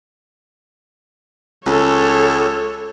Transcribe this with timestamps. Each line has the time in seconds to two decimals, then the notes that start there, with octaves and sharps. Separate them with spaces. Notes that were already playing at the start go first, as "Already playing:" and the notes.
1.66 C#2 A4 C#5